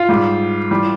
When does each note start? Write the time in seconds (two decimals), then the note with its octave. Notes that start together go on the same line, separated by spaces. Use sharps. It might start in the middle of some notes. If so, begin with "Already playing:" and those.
Already playing: F4
0.09 G#2 G3
0.71 E3 G3